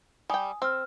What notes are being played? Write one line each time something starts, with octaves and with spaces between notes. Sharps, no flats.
G3 G5 G#5 D#6
C4 E6 F6